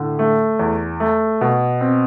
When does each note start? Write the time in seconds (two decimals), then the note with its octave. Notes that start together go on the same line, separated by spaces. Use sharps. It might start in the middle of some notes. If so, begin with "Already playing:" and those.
Already playing: A2 D3
0.19 A3
0.59 E2
1.00 A3
1.41 B2
1.81 C4